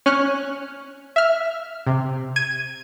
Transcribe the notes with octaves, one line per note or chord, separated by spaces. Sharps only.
C#4 F6 F#6
E5 F6
C3
G#6 D#7